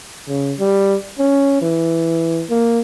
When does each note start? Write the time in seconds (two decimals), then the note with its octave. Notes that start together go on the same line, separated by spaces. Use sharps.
0.28 C#3
0.59 G3
1.19 C#4
1.61 E3
2.50 A#3